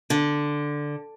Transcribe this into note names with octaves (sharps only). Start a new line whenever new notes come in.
D3